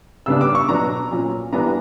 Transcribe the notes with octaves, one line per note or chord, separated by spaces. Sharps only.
C#3 G3 B3 D4 E6
D6
C#6
B2 F#3 B3 D4 A#5
A#2 F#3 C#4
E3 G3 B3 D4 A#5